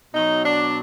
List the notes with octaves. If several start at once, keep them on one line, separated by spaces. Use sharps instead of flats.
B2 F#3 D#4
D4